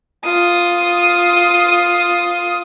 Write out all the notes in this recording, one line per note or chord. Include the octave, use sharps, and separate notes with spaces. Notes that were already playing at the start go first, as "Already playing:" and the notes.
F4 D#6